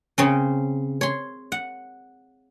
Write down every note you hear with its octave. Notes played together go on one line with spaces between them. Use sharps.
C#3 C4 C#4
C#5 C6
F#5